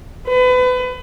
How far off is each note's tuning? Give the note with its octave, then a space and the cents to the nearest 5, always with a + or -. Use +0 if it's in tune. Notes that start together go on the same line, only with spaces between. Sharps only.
B4 +30